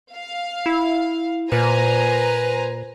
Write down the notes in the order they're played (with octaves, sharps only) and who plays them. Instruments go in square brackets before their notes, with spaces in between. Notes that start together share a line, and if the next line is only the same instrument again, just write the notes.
[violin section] F5
[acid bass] E4
[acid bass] A#2 [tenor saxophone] B4 [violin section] C5 G#5 A#5